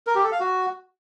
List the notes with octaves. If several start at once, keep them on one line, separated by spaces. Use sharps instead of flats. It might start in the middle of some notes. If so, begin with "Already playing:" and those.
A#4
G4
A4
F5
F#4